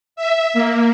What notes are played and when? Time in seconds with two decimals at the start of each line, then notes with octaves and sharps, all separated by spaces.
0.16 E5
0.54 A#3